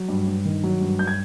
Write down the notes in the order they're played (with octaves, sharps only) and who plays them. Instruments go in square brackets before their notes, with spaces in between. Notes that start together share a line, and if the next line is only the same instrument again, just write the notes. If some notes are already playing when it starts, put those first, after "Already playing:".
Already playing: [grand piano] F#3
G2
G2
D#3
F#3
G2
G2 G6
G#6